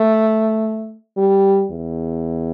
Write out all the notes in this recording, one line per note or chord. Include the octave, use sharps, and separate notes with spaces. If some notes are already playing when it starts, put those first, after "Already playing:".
Already playing: A3
G3
E2